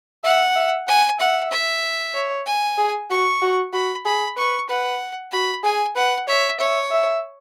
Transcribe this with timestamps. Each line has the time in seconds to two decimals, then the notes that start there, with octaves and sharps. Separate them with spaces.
0.24 E5 F#5
0.56 E5
0.87 F#5 G#5
1.19 E5 F#5
1.51 E5
2.14 C#5
2.46 G#5
2.78 G#4
3.10 F#4 C#6
3.42 F#4
3.73 F#4 B5
4.05 G#4 B5
4.36 B4 C#6
4.69 B4 F#5
5.32 F#4 B5
5.64 G#4 G#5
5.95 B4 F#5
6.28 C#5 E5
6.60 C#5 E5
6.91 E5